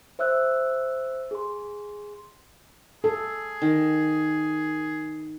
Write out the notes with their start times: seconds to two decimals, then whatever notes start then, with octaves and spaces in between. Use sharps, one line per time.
0.19 C5 E5 E6 F#6
1.31 G#4 C6
3.04 G#4 A4
3.62 D#3